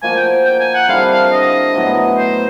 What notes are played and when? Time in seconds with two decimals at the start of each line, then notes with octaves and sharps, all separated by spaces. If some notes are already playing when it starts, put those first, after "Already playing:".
0.02 F3 A#3 D#4 F#4 G#5
0.16 G5
0.45 G5
0.60 G#5
0.74 F#5
0.88 D3 G3 C4 E4 F5
1.10 F5
1.32 D#5
1.75 A2 F#3 B3 E4
2.18 C5